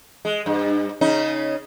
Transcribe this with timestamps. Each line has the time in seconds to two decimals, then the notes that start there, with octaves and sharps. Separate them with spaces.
0.25 G#3
0.46 G2
1.01 C#3 C#4 D#4